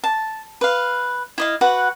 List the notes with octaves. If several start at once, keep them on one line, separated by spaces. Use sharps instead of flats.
A5
B4 F5
E4 D#5 F5
F#4 B4 F#5